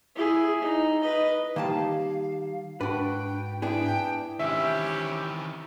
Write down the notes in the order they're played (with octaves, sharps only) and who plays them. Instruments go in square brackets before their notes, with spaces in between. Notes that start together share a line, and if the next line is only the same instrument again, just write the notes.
[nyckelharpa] E4 G#4
D#4
B4 D#5
[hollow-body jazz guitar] D#3 G3 [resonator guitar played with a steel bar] A#3 A5 [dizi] F5
[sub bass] G#2 [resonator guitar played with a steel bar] D4 F#4 [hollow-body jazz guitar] B4 [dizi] G5
[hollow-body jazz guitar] B3 E4 G#4 [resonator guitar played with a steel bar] D4 [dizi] G5
[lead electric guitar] D#3 E3 [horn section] C4 C#4 G4 [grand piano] E5